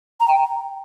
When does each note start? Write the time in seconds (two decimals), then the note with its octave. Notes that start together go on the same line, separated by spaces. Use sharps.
0.20 A#5
0.28 G5